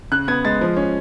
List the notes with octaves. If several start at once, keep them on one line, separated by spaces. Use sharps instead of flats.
C#3 F#6
B3 G#6
G#3 A6
F3
C#4